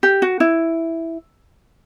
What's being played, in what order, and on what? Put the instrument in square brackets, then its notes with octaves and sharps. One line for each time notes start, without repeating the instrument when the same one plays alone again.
[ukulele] G4
F#4
E4